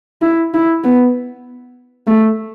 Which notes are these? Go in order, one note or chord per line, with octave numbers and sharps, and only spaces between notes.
E4
E4
B3
A3